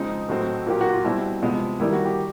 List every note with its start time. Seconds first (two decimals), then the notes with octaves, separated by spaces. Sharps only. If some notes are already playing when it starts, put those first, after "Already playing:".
Already playing: C#3 F3 G#3 C4 D#4
0.28 A2 F#3 A3 C4
0.66 A#2 F#3 A#3 G4
0.81 F#4
0.93 F4
1.04 B2 G3 C4 E4
1.42 C3 F3 G#3 B3
1.80 D#3 G3 A#3 E4
1.93 F#4
2.06 G4